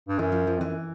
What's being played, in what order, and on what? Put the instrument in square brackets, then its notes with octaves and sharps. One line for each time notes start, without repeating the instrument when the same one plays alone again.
[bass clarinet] G2
[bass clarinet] F#2 [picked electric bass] E3
[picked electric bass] F3
F3
[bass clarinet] F2 [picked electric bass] E3
[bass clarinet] F#2